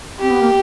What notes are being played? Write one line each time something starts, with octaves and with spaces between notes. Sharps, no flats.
C4 G4
B3
A#3